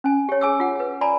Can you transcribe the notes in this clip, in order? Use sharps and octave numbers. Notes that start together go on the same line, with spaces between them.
C#4 G#5
G4 C#5
G#4 G#5 D6 E6
F4 F#5
B4
D5 G#5 A#5 B5